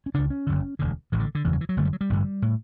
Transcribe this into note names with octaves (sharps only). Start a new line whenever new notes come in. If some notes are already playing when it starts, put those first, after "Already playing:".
C#4
C#2 C#3 D4
C#4
F#1 F#2 D3
E1 D2 D3
A1 A2 E3
D3
D3
F#1 E2 C#3 E3
F#3
E3
F#3
F#1 F#2 D3 A3
G3
F#3
G3
A1 G2 D3
A2